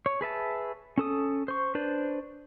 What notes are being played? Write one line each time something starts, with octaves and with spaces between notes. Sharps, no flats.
C#5
G#4 B4 E5 A5
C#4 A4 D#6
C5 C#6
D4 B4 C5 D5